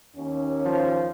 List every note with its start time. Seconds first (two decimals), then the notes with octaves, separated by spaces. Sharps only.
0.16 D#2 C#4
0.65 F3